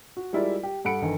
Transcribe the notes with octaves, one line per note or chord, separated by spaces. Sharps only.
F#4
G3 G#3 E4 F4 A#4 D5
G4
G2 A4 F#5 B5 C#7 D7
G1 D#3 E3